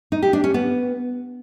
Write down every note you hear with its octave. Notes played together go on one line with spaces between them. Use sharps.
D#4
G4
D4
C#4
B3